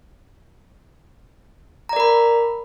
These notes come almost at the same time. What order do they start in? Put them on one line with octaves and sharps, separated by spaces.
A#5 D5 A#4 B5